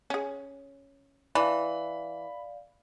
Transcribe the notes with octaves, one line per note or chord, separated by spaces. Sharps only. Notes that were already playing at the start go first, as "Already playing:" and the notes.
C#4 G#4
E3 D4 D5 F5 B5